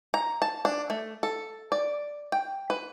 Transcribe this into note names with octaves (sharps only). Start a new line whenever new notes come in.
A#5
A5
D4
A3
A4
D5
G5
B4